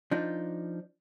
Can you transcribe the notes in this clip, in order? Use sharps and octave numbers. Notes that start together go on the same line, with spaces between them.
F3 D4 D#4